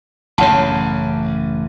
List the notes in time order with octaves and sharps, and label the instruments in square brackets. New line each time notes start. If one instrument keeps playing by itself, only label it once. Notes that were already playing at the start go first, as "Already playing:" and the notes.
[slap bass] A1 F#2 C#3 [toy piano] C#5 F#5 A5